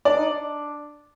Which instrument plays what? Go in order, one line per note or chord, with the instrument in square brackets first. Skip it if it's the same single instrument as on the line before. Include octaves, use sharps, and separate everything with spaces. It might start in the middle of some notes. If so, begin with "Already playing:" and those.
[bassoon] D4 [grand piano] D5
[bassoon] D#4
D4